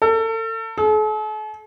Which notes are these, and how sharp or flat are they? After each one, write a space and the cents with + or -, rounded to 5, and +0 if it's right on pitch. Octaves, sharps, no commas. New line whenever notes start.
A4 +35
A4 -45